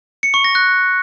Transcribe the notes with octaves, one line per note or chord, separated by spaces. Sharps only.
C#7
C#6
A#6
F#6